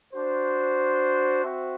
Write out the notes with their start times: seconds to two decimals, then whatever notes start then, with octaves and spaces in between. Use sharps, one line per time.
0.13 D4 F#4 C5
1.44 C4 F#4 C5 E5